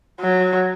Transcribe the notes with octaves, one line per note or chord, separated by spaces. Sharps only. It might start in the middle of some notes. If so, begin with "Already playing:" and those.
F#3